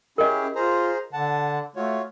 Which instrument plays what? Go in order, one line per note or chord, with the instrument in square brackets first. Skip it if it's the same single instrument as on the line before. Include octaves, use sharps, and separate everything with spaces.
[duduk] C#4 [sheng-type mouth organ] E4 G4 G#4 [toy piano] A#4 D#5
[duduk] F4 [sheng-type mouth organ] G#4 C5 A#5
[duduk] D3 [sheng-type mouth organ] F#5 A5
[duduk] A3 [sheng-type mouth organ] F4 F#4 C#5